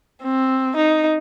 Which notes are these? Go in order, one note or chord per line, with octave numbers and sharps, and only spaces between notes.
C4
D#4